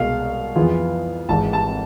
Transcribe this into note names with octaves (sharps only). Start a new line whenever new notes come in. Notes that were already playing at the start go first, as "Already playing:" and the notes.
Already playing: C2 B2 G#3 F5
F2 E3 B3 F4 G#4
G#1 G#2 E3 A5
A5